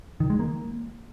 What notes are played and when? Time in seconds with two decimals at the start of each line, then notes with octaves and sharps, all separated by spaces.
0.20 D#3
0.30 G#3
0.39 A#3